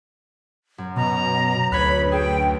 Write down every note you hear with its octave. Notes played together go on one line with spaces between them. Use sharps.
F#2
B2 A#5
D2 B4 C#5 B5 F#6
G#4 A4 G5